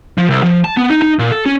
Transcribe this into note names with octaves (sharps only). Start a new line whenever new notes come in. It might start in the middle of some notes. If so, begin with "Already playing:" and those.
F3
C2
F3
A5
B3
D#4
D#4
A#2
A4
C#4